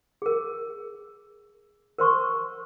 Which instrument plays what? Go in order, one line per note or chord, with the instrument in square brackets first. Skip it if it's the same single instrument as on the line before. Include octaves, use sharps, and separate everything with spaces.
[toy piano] G#4 A#4
A#4 C5 C6 C#6